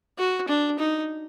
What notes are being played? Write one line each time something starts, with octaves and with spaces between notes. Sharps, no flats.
F#4
D4
D#4